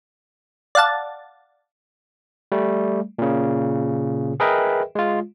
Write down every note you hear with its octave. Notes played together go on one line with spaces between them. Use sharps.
D5 F5 F#5 A5 A6
G3 A3
A#2 C#3
G#4 A#4 B4 D#5 E5 G5
G#3 F4